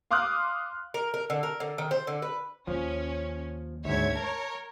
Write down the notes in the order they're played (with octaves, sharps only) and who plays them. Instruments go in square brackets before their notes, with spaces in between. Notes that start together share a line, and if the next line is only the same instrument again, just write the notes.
[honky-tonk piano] F5 C6 D6 D#6 F6 F#6
[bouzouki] A#4
A#4
D3
A#4
D3
D#3
C5
D3
B4
[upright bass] D#2 [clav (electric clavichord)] F3 [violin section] C#4
[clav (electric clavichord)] D2 G#2 [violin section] C#5 E5 G#6
[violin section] A#4 C#5 [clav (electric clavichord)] A5